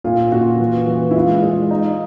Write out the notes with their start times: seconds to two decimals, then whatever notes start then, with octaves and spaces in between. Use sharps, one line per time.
0.04 A#2 F4
0.32 A#2 F#4
0.60 E3
0.87 E3
1.11 E4
1.15 G#3 F4
1.43 G#3
1.71 D#4